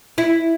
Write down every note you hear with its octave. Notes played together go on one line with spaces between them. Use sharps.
E4